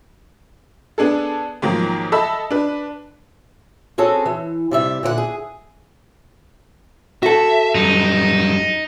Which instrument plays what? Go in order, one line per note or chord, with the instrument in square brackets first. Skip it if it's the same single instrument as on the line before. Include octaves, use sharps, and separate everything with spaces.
[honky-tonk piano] B3 D4 G#4 A4
G#2 D#3 F3 F#3 A#3
A4 D#5 E5 A5 B5 E6
D4 B4
[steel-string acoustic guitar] C4 C#4 F#4 G#4 A4
E3
C3 G3 E5
A#2 D3 C5 F#5
G#4
[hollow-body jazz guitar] F#4 A4 [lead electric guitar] E5
[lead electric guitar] F#2 G3 [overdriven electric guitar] D#4